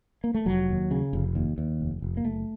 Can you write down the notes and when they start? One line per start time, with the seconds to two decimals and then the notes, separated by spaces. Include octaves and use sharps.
0.24 A#3
0.34 A3
0.46 F1 F#3
0.69 D#2
0.91 C#3
1.13 F1
1.35 D#2
1.58 D#2
1.80 F1
2.02 F1
2.17 A#3
2.25 F#1 A3